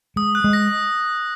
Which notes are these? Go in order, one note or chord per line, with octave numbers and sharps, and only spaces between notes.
G#3 D#6
F#6
G#3
A#6